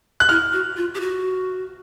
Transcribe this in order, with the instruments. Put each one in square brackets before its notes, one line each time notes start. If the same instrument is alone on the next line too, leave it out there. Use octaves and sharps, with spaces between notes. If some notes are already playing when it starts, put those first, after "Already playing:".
[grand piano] F#6
[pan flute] E4 [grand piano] F6
[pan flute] F#4
F4
G4
F#4